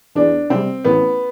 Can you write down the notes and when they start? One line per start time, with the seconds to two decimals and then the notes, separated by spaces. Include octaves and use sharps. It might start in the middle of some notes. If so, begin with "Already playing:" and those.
0.15 E2 D4
0.50 C3 G3 C4
0.85 A1 B3